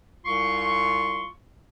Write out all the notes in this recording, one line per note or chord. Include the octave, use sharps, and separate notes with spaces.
C2 F4 C6 C#6